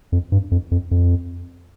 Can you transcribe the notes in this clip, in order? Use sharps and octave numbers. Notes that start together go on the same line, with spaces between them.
F2
G2
F2
F2
F2